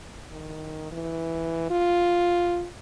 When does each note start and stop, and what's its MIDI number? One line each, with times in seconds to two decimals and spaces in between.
0.31 0.88 51
0.92 1.69 52
1.70 2.67 65